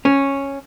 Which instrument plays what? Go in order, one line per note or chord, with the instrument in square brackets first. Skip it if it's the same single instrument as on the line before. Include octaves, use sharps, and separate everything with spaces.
[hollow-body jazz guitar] C#4